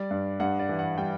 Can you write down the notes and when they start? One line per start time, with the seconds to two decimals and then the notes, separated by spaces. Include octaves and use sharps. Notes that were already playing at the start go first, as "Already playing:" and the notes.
Already playing: G3 D5
0.11 G2
0.40 G2 F#5
0.59 D5
0.69 E3
0.79 F#5
0.98 G3 G5